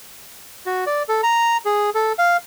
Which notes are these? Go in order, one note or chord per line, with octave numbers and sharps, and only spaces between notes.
F#4
D5
A4
A#5
G#4
A4
F5